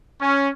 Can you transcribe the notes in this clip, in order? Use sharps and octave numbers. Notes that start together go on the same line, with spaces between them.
C#4